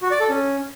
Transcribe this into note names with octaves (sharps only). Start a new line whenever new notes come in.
F#4
D5
A4
C#4